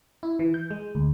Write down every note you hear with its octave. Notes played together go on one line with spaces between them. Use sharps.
E4
E3
G6
G#3
D2